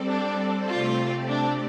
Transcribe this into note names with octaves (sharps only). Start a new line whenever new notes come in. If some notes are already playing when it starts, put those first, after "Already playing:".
Already playing: G3 C4 A4 D5
D4
C3 A3 C4 F4 G4 D5
D4